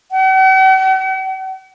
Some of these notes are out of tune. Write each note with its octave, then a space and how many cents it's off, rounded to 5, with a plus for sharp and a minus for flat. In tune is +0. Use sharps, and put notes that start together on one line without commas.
F#5 +45